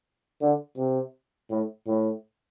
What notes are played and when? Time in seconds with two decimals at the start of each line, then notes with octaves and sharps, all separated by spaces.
0.41 D3
0.77 C3
1.50 A2
1.87 A2